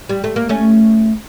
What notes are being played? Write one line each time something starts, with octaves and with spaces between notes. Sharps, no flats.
G3
A3
A#3
A3 C#4